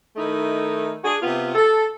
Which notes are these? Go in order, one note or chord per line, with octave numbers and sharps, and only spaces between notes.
D#3 A3 D#4 E4
D4 F#4 G#4
C3 B3 F4
A4